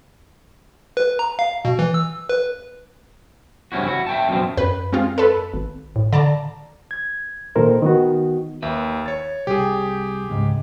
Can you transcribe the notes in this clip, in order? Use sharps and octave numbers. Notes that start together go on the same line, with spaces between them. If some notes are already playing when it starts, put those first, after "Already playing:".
B4
A#5
F5
B2
E3
E6
B4
G2 C#3 F3 C#4 E4 F#4
E4 F#4
E5 G5 A5
F#2 B2 D#3 F3 C4
F#2 B4
G#3 C4 F4
A4 B4
G#1
A2
D3 D5 A5 A#5
G#6
A#2 D#3 A4 A#4 C5
D#3 B3 F#4
D#2 B4 E5
C#5 A6
C2 G4 G#4
C#2 G#2